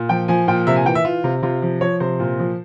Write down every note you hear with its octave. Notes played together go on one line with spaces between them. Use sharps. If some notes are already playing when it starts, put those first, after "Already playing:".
Already playing: A#2
F3 G5
F3 G#5
A#2 G5
C3 E5
G#5
E3 G5
E5
E3 F4
C3
C3 F4
F3
F3 C#5
C3 C5
A#2
F3